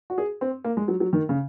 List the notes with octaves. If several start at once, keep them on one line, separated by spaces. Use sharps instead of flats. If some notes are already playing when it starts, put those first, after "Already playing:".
F#4
G#4
C4
A#3
G#3
F#3
F#3
D#3
C#3